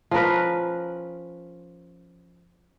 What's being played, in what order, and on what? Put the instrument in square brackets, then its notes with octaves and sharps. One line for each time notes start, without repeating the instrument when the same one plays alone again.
[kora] F3 C#4 A#4 B4